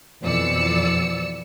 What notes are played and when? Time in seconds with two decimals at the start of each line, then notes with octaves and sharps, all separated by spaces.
0.23 F2 B2 E3 D5 E6 C#7